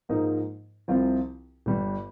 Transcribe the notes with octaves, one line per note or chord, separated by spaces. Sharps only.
G#2 F3 A#3 D#4 A#4
C2 C3 F3 C4 F4
G1 G2 G3